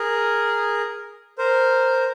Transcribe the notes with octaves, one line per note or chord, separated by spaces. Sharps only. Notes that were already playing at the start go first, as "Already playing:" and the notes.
Already playing: G#4 A#4
A#4 C5